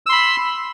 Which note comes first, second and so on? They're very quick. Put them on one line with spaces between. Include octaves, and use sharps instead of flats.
E6 C6 B5